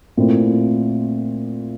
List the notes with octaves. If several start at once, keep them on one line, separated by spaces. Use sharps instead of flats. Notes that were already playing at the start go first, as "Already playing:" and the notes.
A#2 A3 C4 E4